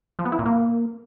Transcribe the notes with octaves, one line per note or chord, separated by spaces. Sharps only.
F3
B3
E4
A#2
A#3